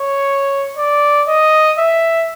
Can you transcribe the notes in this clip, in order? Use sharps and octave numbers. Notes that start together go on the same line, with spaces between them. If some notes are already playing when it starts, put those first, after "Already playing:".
Already playing: C#5
D5
D#5
E5